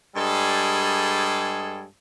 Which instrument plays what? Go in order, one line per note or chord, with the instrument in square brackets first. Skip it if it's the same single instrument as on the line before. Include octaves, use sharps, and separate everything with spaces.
[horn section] G2 G3 G#3 G#4 A4